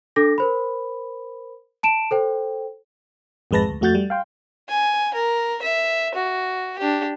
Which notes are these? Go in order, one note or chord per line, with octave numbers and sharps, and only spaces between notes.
D4 A4 D6 A#6
A#4 C5 B5
A5 D7 E7
A4 C5 G5
G#1 F2 G#3 B4 A5 A#6
D2
F2 A3 F#4 F#5 G6 A6
G3
F5 G5 C6
G#5
A#4
E5
F#4
D4 G4